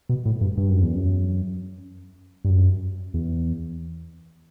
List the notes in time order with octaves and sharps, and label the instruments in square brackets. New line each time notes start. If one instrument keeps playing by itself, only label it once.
[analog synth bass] B2
A2
G2
G2
F#2
E2
F#2
G2
F#2
E2